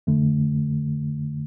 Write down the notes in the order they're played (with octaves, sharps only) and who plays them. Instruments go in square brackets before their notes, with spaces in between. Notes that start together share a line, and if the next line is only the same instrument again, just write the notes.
[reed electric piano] F2 D3 A3